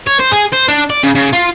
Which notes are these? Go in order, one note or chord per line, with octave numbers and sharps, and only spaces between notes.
C#5
C5
G#4
C5
D4
D5
C#3
C#3
F4